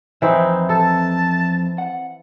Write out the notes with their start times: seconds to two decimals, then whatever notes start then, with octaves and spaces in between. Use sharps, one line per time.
0.22 F2 E3 C4 D#4 E5
0.69 A4 A5
1.78 F#5